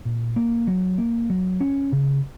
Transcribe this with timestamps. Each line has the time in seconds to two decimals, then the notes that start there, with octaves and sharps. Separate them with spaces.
0.05 A#2
0.36 A#3
0.67 F#3
0.98 A#3
1.30 F#3
1.61 C#4
1.92 C#3